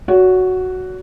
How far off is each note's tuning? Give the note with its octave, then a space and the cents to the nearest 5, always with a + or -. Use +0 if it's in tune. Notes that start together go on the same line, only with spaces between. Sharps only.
F#4 +0 C#5 +35